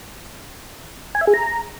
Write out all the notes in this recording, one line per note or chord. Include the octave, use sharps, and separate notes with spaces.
G#5
E5
G#4
A#5